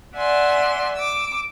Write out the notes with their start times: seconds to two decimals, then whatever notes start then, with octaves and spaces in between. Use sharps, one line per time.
0.16 D5 E5 F#5 G#5 C6
0.94 D6 E6